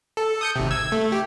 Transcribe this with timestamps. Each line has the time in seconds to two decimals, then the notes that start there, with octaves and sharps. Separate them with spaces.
0.17 A4
0.41 D#6 G6 C#7
0.56 G#1 C3
0.71 E6 G#6
0.92 A3
1.12 G4